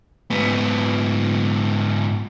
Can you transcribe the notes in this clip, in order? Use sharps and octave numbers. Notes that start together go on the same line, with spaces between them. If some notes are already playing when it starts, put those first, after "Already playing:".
G#2 B3